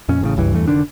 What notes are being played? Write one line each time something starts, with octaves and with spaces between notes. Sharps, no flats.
F2 A#2 C#4
A1 A2 C#3
F#1 C#2 G2 E3
E2 G2 E3 A3
F1 D3 D#3 D4